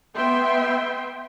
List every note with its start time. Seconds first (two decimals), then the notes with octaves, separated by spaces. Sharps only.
0.16 B3 E5 G5 C6